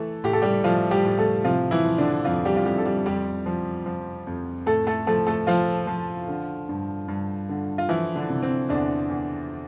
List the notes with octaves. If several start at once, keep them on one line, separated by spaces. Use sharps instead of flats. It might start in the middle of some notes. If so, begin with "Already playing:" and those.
Already playing: E3 A3 A4
A2 G4
A4
G3 G4
A2 F3 F4
G3 G4
A2
A3 A4
C3 F3 F4
E3 E4
F3
D3 D4
F2 F3 F4
G3 G4
F4
F2 G3 G4
A4
G3 G4
F2 G3 G4
F3
F3
F2
A2 A3 A4
A3 A4
F3 A3 A4
A3 A4
F3 F4
F3
D3
G2
G2
D3
F4
E3 F3 E4
D3 D4
C3
C4
E2 D3 D4
E2